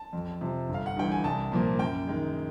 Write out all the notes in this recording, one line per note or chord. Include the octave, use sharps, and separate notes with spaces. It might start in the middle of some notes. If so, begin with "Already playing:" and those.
Already playing: A5
F2
C3 F3
G1
F5
F#5
G2 E3 G5
G#5
C2 A5
A#2 F3 A#3
F#2 G5
D#3 G#3